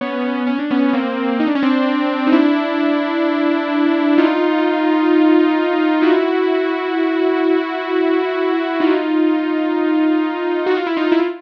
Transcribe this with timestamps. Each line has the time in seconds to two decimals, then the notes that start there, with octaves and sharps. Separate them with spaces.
0.01 B3 C#4
0.47 C#4
0.59 D4
0.70 B3 C#4
0.93 A#3 C4
1.40 D#4
1.47 D4
1.55 C#4
1.62 C4 D4
2.27 D#4
2.32 D4 E4
4.18 D#4 F4
6.02 E4 F#4
8.80 D#4 F4
10.66 F#4
10.77 F4
10.86 E4
10.96 D#4 F4
11.12 E4
11.19 F4